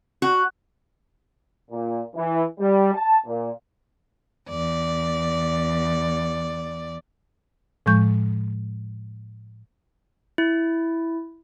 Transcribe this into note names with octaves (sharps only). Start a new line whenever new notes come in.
F#4
A#2
E3
G3
A5
A#2
E2 D5
A2 F3 G#3 C#6 G6
E4